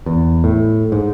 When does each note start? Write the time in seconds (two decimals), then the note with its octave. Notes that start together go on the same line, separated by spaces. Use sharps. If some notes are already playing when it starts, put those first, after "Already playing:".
0.06 E2
0.44 A2
0.92 G#2